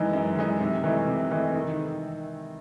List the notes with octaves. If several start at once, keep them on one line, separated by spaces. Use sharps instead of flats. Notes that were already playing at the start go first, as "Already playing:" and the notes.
Already playing: F#2 E3 G#3 D#4
F#2
E3 G#3 D#4
C3
E3 A3 D#4
C3
E3 A3 D#4
D#3